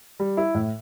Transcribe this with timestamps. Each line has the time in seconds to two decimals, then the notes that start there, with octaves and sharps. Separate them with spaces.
0.20 G3
0.37 E4
0.55 A2